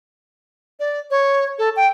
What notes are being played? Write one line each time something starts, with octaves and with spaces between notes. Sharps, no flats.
D5
C#5
A4
G5